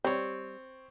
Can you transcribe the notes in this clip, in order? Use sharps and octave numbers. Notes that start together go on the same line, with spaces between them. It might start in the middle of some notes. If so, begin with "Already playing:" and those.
G3 C4 C#5